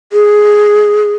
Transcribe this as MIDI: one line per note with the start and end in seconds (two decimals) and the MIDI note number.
0.12 1.14 68